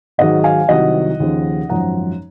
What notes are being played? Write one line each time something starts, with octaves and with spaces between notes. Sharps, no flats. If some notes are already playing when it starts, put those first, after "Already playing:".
G#1 G#2 D#3 F#3 D#5 F#5
F5 G#5
C2 C3 D#3 F#3 D#5 F#5
D#2 C#3 F3
G#1 F#2 F3 F#5 A#5